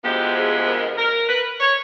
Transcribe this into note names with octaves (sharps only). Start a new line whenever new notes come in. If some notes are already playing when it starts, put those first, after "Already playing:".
D2 C3 F3 G#3 B3 G4
G#4
A#4
A#4
B4
C#5